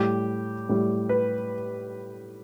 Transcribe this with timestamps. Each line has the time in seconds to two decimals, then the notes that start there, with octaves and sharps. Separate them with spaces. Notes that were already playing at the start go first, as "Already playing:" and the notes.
Already playing: A2 G3 G4
0.69 A2 G3
1.09 B4